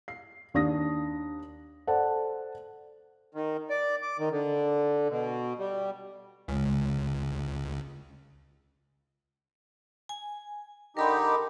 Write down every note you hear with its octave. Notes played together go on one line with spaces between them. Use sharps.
C7
D#2 D4 D#6 A#6
A4 C5 D5 F#5 A5
D#3
D5
D6
D#3
D3
B2
G3
C#2 C#3 G#3
G#5
D3 D#4 G4 A#4 B5 C6